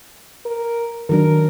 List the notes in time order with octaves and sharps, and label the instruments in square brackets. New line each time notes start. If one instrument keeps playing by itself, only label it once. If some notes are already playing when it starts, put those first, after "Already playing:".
[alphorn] A#4
[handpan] D#3 F#3 D4 [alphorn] A#4